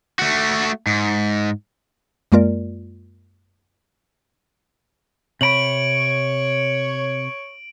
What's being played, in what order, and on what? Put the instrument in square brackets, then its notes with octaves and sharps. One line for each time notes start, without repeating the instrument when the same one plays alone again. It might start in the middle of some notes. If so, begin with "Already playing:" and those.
[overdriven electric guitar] A3 F#4
G#2
[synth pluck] F#2 G#3 A#3 F4 A#4 D5
[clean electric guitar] C3 A#5 B5 [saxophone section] C#5 [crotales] D7 F#7